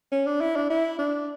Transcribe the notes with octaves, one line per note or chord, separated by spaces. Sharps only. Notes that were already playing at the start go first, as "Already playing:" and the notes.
C#4
D4
E4
D4
E4
D4